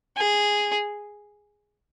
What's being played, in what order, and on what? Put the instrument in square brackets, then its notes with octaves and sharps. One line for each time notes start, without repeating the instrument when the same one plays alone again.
[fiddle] G#4